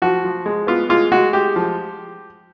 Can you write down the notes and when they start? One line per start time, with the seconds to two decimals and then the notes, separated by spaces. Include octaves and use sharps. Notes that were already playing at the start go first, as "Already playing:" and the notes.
0.02 F3 F#4
0.24 F3
0.46 G#3
0.67 B3 F4
0.89 G#3 F4
1.12 G#3 F#4
1.33 G#3 G4
1.56 F3